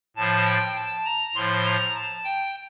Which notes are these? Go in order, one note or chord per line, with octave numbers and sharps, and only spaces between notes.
A2 F3 A5
G5
A5
A#5
A2 F3 C6
A#5
A5
G5